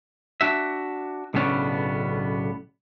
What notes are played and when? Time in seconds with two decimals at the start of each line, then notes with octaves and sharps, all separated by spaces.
0.41 D4 F#4 E5
1.34 B1 A2 C#3 B3 C#4 D4